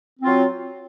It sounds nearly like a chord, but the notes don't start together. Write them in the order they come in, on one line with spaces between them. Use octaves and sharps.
C4 F4 F#3